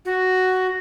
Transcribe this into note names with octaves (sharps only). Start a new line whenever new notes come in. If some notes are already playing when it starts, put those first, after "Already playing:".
F#4